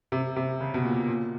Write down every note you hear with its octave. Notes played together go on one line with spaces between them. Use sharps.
C3
C3
C#3
B2
A#2
A#2